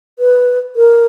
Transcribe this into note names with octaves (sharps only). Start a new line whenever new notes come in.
B4
A#4